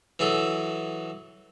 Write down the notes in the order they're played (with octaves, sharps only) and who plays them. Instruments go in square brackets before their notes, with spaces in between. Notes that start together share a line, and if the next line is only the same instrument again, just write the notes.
[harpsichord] E3 F#3 G#4 A4